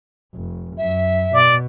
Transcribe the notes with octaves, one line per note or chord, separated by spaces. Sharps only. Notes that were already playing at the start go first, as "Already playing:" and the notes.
F1
F#2 E5
B2 D5